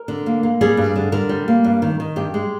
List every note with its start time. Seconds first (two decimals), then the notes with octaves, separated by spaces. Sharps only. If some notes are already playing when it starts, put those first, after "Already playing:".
Already playing: A#4
0.08 D3
0.26 A#3
0.43 A#3
0.61 G3 G#4
0.77 G2
0.96 D3
1.12 D3 A#4
1.29 G3
1.48 A#3
1.64 G2
1.82 D#3
2.00 D#3
2.16 G2 G4
2.34 G#3